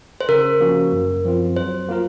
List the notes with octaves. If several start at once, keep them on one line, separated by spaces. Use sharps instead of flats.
C5
C#3 A#4
F3 A#3 C#4 F#4
F#2
F3 C4 F4
F#3 C5
A#3 F4 A#4